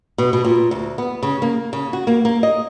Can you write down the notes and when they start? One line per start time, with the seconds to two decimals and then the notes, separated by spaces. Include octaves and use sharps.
0.18 B2
0.33 B2
0.45 A#2
0.71 D2
0.98 B3
1.23 C#3
1.42 A#3
1.73 C#3
1.93 F#4
2.07 A#3
2.25 A#3
2.43 D#5